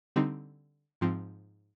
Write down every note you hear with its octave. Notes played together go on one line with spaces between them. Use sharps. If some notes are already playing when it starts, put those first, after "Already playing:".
D3 G3 C4 D#4
G#2 F3 C4